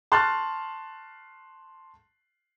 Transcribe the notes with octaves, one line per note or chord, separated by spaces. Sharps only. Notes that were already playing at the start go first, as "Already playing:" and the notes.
A5 C6 C#6 F6 F#6 A6